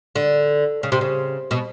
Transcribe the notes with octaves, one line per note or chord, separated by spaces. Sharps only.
D3
C#3
C3
C#3
B2